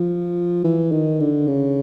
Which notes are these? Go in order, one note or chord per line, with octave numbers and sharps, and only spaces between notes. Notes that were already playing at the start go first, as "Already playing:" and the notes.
Already playing: F3
E3
D#3
D3
C#3